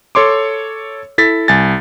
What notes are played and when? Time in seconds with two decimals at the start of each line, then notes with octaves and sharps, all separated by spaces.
0.15 A4 C#5 C6 D6
1.18 E4 A4 A6 B6
1.48 C2 G#5 A6